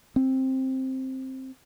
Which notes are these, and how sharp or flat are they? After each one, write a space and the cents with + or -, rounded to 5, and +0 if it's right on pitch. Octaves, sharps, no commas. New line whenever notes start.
C4 +10